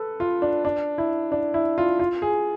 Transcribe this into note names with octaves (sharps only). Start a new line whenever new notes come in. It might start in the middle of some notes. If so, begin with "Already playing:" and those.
Already playing: A4 B4
F4
D4
D4
E4
D4
E4
F4
F4
G#4